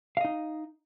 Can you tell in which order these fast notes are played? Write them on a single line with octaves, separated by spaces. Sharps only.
F5 D#5 D#4